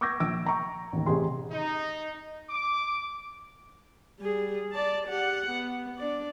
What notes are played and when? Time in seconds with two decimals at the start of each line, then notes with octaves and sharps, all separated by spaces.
0.01 C#6 D6 E6 G6 G#6 A#6
0.20 A#1 E6 D7
0.46 A#5 C#6
0.93 A1 D#2
1.06 A1 C3 G4 G#4 C6
1.52 D#4
2.50 D6
4.20 G3 G#4
4.72 D5 A5
5.07 G4 F#5
5.51 B3
5.98 D4 D5